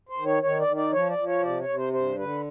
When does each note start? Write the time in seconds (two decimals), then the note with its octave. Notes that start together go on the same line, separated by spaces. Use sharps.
0.09 C5
0.18 D#3
0.25 C#5
0.43 D#3 C#5
0.59 D5
0.67 D#3
0.76 D5
0.92 F3 C#5
1.09 D5
1.17 F3
1.27 C#5
1.43 C3 D5
1.61 C#5
1.69 C3
1.77 C5
1.93 G2 C5
2.18 D3 B4